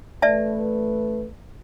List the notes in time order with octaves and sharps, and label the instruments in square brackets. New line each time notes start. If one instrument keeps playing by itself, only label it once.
[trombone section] A1 A3 B4 [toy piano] D5 E5 A5